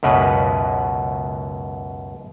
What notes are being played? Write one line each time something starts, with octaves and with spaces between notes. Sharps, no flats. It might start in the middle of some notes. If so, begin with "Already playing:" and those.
C#2 F#2 B2 B4